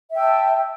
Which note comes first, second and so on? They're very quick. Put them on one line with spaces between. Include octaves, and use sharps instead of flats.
E5 G5 E6 A5